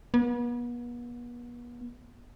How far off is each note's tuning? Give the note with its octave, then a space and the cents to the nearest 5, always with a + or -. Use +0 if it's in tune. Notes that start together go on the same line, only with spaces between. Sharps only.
B3 -40